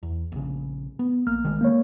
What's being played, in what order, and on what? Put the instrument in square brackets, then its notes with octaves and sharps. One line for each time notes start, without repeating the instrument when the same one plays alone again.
[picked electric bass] E2
A#1 C#3
B3
[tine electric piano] A#1 F6 [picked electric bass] A#3
[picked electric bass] D#3 G#3
[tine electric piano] A#3 C#5